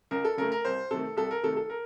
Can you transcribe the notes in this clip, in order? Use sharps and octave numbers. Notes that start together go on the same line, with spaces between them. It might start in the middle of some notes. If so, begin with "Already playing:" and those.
C#2 A#4
A4
C#3 A3 A#4
A#4
C2 C5
C3 D#3 A3 A4
C2 A4
A#4
C3 D#3 A3 A4
A4
A#4